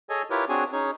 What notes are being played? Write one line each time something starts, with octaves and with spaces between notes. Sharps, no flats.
G#4 A4 C#5 D#5 G#5
E4 F4 G4 A#4 B4 C#5
C4 D4 F#4 G#4 C#5 G#5
C#4 D#4 G#4 C#5